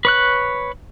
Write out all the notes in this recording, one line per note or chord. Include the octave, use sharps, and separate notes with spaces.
B4 C#5 F#6